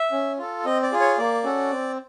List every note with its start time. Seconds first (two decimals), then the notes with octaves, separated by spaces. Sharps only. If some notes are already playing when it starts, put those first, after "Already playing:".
Already playing: E5
0.12 C#4
0.38 F4 A4
0.65 C4 D#5
0.83 D5
0.92 F4 G#4
1.00 C#5
1.18 A#3 D5
1.44 C#4 F#4 A4
1.71 C4